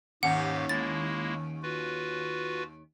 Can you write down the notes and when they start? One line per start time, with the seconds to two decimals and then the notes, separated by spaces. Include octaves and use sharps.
0.23 D#2 G#2 C#4 G4 F5 F#5
0.69 G#3 A#3 E4 A6
1.63 F4 F#4 B4